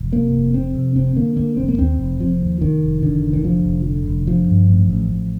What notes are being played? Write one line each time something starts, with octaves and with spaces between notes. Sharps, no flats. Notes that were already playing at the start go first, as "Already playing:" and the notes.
Already playing: F1
C3 A#3
F1
F2 C4
C3
F1 C4
D3 A#3
D3 A#3
F1 C4
A#3
D#2 C4
F1
F1 F3
D#2
F1 D#3
F1
D3 D#3
F1
D#3
D3 F3
F1
D3
F1
D3 F3
G2
A1
A1
A1